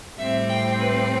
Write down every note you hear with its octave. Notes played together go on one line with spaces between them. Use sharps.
A2 G3 C4 E5
G5
B4